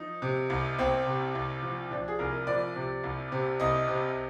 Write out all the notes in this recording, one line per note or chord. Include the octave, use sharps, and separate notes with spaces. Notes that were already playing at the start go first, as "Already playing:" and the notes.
Already playing: F3 D#4
C3
C2
C2 C4
C3
C2
F3
F3 D4
G#4
C2 A#4
F3 D5
C3
C2
C3
C2 D#5
C3